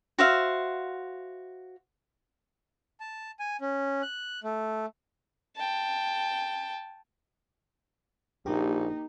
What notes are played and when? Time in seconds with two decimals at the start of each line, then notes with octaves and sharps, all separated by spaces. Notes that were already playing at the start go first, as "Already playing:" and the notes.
0.19 F#4 C5 E5 F5
3.00 A5
3.39 G#5
3.61 C#4
4.02 F#6
4.44 A3
5.56 G5 A5
8.46 A#1 A#3 D#4 G4